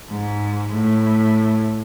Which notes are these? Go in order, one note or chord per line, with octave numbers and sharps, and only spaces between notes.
G#2
A2